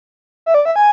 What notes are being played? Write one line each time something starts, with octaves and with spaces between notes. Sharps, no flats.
E5
D5
E5
G#5